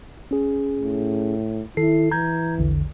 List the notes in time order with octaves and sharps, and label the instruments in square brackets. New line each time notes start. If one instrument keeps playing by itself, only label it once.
[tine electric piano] C#4 G#4
[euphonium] A2
[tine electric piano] D#3 A4 C7 [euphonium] E4
[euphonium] E3 [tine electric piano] A#5 G6 G#6
[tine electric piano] A#1 E2 D3